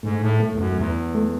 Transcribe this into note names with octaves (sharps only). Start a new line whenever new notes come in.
G#2 A3
A2
A3
E2
F#2
E2
A3